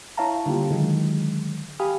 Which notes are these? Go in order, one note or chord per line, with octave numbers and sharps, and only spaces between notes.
E4 C#5 E5 F5 A5 A#5
D3 G3 A#3 F4 G4
D3 D#3 F#3 G#3
G4 F5 G#5 B5 D#6 F6